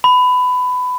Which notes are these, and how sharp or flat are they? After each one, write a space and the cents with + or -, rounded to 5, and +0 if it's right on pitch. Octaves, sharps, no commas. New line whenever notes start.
B5 +20